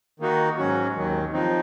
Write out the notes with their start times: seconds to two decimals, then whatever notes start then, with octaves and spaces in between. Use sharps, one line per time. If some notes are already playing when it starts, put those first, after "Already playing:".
0.20 D#3 A#3 D#4 F#4
0.57 G#2 F#3 C#4 F#4
0.95 D#2 D#3 F#3
1.33 F3 C4 D#4